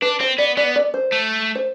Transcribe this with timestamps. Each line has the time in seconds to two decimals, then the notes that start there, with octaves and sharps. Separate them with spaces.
0.02 D4 B4
0.20 C4 C5
0.38 B3 D5
0.57 B3 D5
0.76 D5
0.94 C5
1.12 A3
1.55 C5